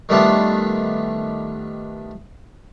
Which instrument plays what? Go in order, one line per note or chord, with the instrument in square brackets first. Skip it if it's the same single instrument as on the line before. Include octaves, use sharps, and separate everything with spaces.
[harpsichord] D#3 G3 A3 B3 D4 F4